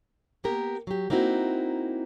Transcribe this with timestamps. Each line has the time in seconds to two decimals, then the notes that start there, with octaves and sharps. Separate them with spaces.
0.44 A#3 B3 G4 A#4
0.87 F#3 G4
1.10 A#3 C4 D#4 E4 F#4